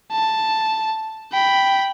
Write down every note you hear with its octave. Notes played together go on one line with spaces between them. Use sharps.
A5
G5 B5